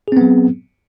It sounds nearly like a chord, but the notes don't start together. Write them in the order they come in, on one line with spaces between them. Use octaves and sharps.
G#4 C4 B3 F#3